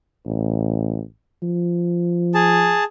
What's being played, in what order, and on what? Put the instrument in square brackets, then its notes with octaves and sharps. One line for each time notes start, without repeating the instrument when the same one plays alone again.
[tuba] A1
F3
[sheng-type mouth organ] G#4 A5